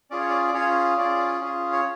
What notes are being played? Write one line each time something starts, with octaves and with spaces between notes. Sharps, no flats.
C#4 F4 G#4 D5
C#5
D5
D5
C#4 F4 G#4 C#5
C#4 F4 G#4 D5
C#4 F4 G#4
C#5